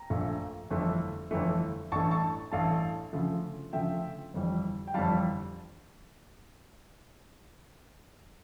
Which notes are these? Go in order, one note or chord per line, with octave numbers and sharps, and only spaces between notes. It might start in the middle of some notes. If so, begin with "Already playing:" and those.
Already playing: G5 A#5
A#1 A#2 A3
G1 F2 E3 A3
G1 F2 E3 A3
A1 G2 E3 A3 A5 C#6
A5 C#6
A1 G2 E3 A3 F5 A5
D2 C#3 F3 A3
D2 C#3 F3 A3 E5 G5
G1 F2 E3 G3
G5
G1 F2 E3 G3 F5 A5